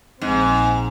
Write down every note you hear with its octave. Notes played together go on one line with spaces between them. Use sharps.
A#1 G#2 C4